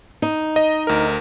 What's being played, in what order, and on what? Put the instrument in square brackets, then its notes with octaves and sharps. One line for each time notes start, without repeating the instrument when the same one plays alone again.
[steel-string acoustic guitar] D#4
[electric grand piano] D#5
D2 A#4